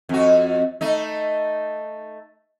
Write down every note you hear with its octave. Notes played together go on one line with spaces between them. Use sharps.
F2 F#4
A3 D#4